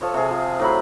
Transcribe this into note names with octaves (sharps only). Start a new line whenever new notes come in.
F3 A4 C#5
C3 G#4
F4
A2 F#3 B5